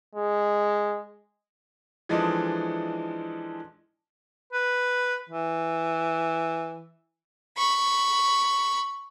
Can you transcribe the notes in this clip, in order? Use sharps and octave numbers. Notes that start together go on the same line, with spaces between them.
G#3
E3 F3 G#3 D4 D#4 A4
B4
E3
B5 C#6